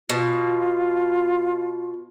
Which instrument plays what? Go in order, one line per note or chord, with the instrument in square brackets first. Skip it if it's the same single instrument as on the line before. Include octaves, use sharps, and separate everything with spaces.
[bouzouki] B2 [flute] F4